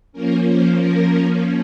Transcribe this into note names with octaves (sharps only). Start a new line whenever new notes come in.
F3 A#3 C#4 A#4
C5
A#4